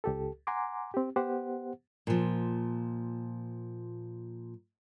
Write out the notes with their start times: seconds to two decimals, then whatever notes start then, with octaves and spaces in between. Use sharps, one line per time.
0.04 C#2 G4 A4
0.47 F#5 G#5 A#5 C6 D6
0.94 C4 G4
1.16 B3 G4 C5 F#5
2.07 A#2 F3